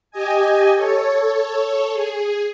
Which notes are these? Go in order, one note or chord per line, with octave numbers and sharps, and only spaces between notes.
G4 D#5 G#5
A4 C#5
G#4